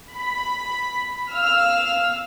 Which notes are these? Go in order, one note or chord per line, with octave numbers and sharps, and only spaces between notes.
B5
F5 E6 F6